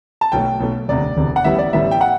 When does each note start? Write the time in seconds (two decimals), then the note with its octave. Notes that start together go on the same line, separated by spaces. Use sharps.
0.21 A5
0.32 B1 B2 A3 G5
0.60 B1 B2 A3
0.88 E1 D2 C3 D5
1.17 E1 D2 C3
1.36 F#5
1.44 A1 A2 G3 B3 E5
1.58 D5
1.73 A1 A2 G3 B3 E5
1.91 G5
2.01 F#5